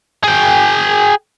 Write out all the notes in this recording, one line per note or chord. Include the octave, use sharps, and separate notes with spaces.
G#4 G5